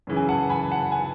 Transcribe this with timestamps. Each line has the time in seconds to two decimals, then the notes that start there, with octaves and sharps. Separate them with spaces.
0.07 F#2 C#3 E3
0.17 G#5
0.29 F#5 A5
0.50 G#5 B5
0.71 F#5 A5
0.92 G#5